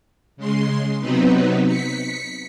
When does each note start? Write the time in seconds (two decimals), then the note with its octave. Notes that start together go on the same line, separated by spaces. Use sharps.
0.37 C#3 G#3 C6
1.00 C3 F#3 B3 C4 D#4 B4
1.65 B6 C#7